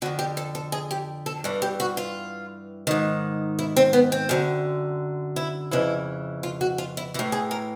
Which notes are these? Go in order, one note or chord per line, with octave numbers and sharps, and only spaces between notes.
F2 D3 F#4
G4
A4
A4
G#4
G4
A4
G2 E3
G4
F#4
F4
G#2 D#3
E4
C4
B3
C4
F#2 D3
E4
F2 C#3 E3 E4
F4
F#4
F4
E4
A2 E3 E4
G#4
A#4